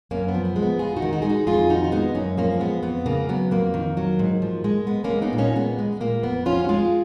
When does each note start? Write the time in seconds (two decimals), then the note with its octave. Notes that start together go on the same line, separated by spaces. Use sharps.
0.11 F#2 A#3 C#4
0.28 B3
0.34 F3
0.45 B3
0.56 G#3
0.62 B3
0.79 F2 F4 G#4
0.96 D#4 F#4
1.02 D#3
1.13 D#4 F#4
1.22 G#3 G#4
1.29 D#4 F#4
1.47 F2 F4 G#4
1.69 D#3 D#4 F#4
1.84 F4
1.92 G#3 B3 D#4
2.15 F#2 A#3 C#4
2.37 F3 A#3 C#4
2.60 G#3 B3
2.83 F2 B3
3.06 C#3 A#3
3.29 F#3 B3
3.51 F2 A#3
3.74 D#3
3.97 F#3
4.19 G#2
4.42 F3
4.64 G#3
4.87 G#3 B3
5.04 A#3 C#4
5.10 G#3
5.22 B3 D#4
5.33 A#2
5.38 A#3 C#4
5.56 G#3 B3
5.79 G#3
6.00 A#2 A#3
6.23 F2 B3
6.46 F3 C#4 F4
6.64 F#4
6.69 G#3 F4 G#4